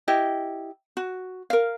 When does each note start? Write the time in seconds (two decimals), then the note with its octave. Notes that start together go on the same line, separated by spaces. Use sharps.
0.08 E4 G4 D#5
0.97 F#4
1.50 A#4 F5